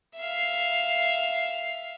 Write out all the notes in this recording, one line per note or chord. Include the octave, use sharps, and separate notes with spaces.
E5 F5